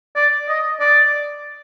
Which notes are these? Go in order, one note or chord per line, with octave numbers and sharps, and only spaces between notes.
D5
D#5
D5